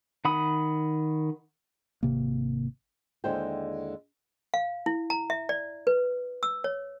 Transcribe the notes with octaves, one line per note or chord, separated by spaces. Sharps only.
D#3 F#5 B5 D#6
G#1 C3 A#3
D#2 D3 G#3 E4 C5 G5
F5
E4
A#5
E5
D5
B4
E6
C#5